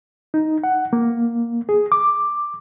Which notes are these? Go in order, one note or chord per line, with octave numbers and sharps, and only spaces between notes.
D#4
F#5
A#3
G#4
D6